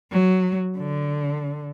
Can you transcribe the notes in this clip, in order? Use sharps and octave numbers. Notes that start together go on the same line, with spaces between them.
F#3
D3